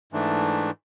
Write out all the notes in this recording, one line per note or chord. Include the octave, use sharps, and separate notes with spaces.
G#2 E3 A3 D4